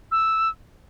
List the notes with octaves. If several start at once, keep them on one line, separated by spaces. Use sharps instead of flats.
E6